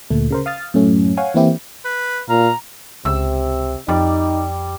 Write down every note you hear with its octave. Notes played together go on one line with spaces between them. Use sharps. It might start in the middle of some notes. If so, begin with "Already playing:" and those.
D2 A#2 A3
C#3 A#4 C5
F5 D#6 F6 A6
F#2 A2 A3 C#4
C#5 F5 F#5 G#5
E3 A#3 C4 E4 G4
B4
A#2 F5 A#5
C#2 C3 E6
F2 G3 D#4 D5 D6